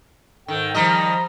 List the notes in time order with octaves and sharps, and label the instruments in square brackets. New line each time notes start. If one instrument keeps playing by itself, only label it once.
[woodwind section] G#2 A4 G5 [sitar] D#3
[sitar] D#3 G3 D#5 [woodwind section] F3 A#5